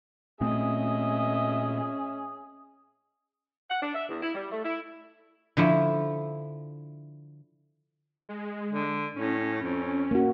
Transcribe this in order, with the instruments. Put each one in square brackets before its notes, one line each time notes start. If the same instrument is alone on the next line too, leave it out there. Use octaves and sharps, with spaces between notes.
[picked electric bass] A#2 A3 C4 [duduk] C#4 [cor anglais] G#4 [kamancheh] D#5 E5
[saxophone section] F#5
D4
E5
E2
E4
G3
A3
E4
[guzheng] D3 F3 E4 C#5
[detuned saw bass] G#3
[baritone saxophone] D3
[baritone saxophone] A2 [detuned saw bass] C#4
[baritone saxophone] F2
[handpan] A#3 F#4